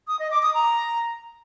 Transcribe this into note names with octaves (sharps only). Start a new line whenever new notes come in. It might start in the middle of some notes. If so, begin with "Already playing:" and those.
D#6
D#5
D6
D#6
A#5